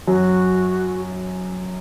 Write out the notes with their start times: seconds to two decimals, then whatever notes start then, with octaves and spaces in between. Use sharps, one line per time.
0.07 F#2 F#3 F#4